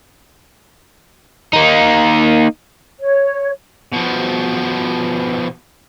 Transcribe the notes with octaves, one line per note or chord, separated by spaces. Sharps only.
A#3 D#4
C#5
B2 F3